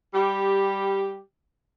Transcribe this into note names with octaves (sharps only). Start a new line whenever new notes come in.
G3 G4